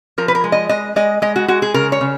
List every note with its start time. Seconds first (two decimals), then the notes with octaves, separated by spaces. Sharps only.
0.18 F3 A#4
0.28 B4
0.35 A#4
0.44 G#3
0.52 D#5
0.69 G#3 D#5
0.96 G#3 D#5
1.22 G#3 D#5
1.36 F#4
1.48 G#3 F#4
1.62 G#4
1.74 C#3 A#4
1.92 C#5
2.01 C#3